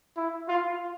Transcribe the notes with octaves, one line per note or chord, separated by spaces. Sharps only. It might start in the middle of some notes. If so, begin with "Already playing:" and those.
E4
F4